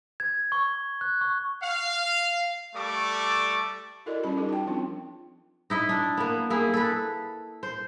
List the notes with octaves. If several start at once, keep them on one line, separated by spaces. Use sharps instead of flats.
G#6
C#6
F#6
C#6
F5
G3 A3 A4 D5 C#6 D6
E4 F#4 A4 A#4 D5 D#5
G3 C#4 F4 B5
D#4 F#4 G#4 A#4
G5 A5
F3 C4 D4 F4
D#4 E4 D#5
D4
A#3 B3
A#3 E4 G#4
A4 B4
C5